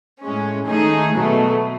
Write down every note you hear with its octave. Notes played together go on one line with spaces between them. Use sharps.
A2 G#3 C#4
D#3 A3 D#4 G#4
B2 F#3 A3